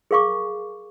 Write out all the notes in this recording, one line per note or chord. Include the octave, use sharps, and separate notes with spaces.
G#4 A#4 F5 C#6 D6